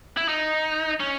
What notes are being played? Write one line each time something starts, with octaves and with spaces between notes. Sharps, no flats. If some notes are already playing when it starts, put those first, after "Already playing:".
E4
D#4
C#4